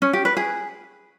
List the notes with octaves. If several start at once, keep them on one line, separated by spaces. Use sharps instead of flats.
C#4
G4
B4
G#4